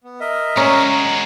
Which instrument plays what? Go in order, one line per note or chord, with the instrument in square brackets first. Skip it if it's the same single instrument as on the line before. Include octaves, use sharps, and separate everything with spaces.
[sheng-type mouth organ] B3
A#4 D#5 E5
[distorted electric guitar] G#3 F#4 [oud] C#4 [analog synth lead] A#5